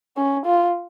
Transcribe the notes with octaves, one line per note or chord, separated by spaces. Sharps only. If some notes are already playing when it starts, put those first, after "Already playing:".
C#4
F4